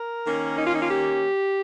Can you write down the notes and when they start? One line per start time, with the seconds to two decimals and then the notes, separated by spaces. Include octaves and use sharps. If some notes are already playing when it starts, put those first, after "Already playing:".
Already playing: A#4
0.26 D#3 A#3 C#4
0.58 D#4
0.66 F4
0.74 D#4
0.82 F4
0.90 G4